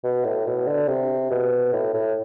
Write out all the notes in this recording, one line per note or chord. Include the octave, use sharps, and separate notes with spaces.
B2
A2
B2
D3
C3
B2
A2
A2